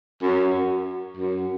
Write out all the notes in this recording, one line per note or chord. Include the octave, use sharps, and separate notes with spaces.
F#2
F#2